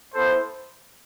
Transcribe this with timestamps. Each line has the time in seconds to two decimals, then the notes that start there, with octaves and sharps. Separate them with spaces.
0.14 B3 E4 A4 C5